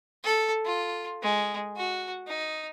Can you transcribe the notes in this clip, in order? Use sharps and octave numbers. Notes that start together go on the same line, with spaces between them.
A4
F4
G#3
F#4
D#4